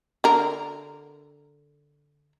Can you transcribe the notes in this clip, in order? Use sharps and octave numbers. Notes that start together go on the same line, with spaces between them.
D3 A#4